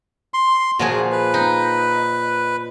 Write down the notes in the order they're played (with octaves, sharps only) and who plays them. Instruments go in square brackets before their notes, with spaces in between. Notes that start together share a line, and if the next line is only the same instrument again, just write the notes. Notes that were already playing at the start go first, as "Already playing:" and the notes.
[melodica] C6
[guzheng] A#2 F3 G#4 [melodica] F#4
[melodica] B4
[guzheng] D#4